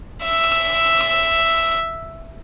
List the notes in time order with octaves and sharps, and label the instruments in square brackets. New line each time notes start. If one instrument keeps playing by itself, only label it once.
[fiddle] E5 E6